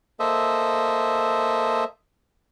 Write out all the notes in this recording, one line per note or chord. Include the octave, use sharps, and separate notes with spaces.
A#3 A4 C5 D#5 E5